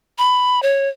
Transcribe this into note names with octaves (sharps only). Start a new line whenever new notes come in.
B5
C#5